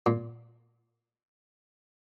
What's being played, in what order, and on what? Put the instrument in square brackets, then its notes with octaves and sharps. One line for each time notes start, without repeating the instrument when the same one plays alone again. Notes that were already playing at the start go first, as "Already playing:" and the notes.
[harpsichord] A#2